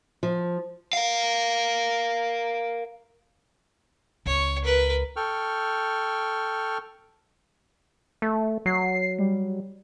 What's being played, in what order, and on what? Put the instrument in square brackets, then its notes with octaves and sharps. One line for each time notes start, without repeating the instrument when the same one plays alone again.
[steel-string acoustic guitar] F3
[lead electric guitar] A#4 F5
[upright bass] C#2 [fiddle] C#5
[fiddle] A#4 B4
[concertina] A4 G5 C#6 F6
[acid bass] A3
[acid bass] F#3 [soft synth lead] C7
[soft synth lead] G3